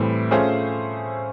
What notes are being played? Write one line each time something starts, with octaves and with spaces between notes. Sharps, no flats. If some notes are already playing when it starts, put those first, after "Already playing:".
Already playing: A2 E3 G3 C4
A3 C#4 F4 G#4 C5